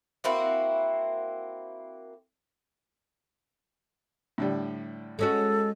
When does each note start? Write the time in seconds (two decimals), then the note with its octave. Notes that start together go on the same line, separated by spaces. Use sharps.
0.24 A#3 C4 E4 F#4
4.38 A2 D3 G3
5.19 G#3 C#4 F#4 A4